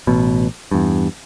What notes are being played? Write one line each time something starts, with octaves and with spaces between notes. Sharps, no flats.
A1 B2
E2 G2